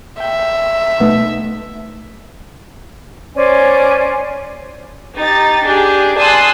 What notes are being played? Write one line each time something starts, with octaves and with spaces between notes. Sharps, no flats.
E5 G5
B2 A3 D#4
C#4 C5 D5 G#5
D#4 G4 A6
D4 G4 G#4
G#5 A5 C6 D#6 E6 F#6